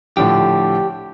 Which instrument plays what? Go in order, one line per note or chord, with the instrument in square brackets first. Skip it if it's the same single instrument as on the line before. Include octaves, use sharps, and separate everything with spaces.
[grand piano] A2 D3 F3 [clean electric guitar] G4